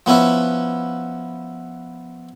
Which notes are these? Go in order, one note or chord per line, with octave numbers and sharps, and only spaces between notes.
F3 B3 C#4 E4 B4